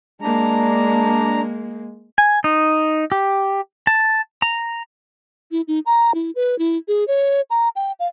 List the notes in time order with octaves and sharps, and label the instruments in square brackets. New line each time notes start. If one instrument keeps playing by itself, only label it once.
[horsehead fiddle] G#3 A#3 [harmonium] D4 A#5
[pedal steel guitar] G#5
D#4
G4
A5
A#5
[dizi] E4
D#4
A#5
E4
B4
E4
G#4
C#5
A#5
G5
F5